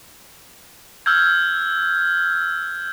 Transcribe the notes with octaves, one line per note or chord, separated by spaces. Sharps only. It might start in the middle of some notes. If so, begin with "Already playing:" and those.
E6 F6 G6 G#6